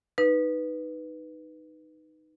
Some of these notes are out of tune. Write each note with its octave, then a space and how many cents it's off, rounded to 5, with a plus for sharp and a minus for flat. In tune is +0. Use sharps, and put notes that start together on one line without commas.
D#4 +0 B4 +0